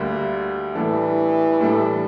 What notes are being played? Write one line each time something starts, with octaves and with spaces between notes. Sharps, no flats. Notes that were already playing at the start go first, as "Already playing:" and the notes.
Already playing: D2 D3 G3 A#3
A2 E3 G3 D4 A4
A2 G3 D4 A4